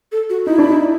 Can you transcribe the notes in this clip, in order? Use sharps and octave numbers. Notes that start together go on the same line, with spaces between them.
A4
F#4
D#4 E4
D4
D#4